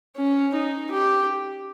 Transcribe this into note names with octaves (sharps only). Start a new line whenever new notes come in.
C#4
D#4
G4